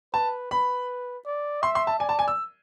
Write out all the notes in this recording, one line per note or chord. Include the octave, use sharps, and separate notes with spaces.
B4 A5
B4 B5
D5
E5 C6
C6
A5
D5 G#5
A5
G#5
E6